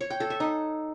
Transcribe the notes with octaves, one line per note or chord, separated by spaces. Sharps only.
C#5
G5
A4
E5
D#4